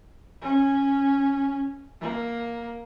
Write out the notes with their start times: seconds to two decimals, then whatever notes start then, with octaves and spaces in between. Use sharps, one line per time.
0.42 C#4
2.00 A#3